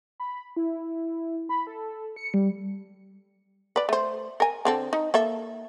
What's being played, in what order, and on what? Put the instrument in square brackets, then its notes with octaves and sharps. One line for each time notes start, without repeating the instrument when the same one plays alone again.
[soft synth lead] B5
E4
B5
A4
C#7
G3
[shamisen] B4 D5
A3 C5
A#4 G#5
D3 C4 A4
D#4
A#3 A4 E5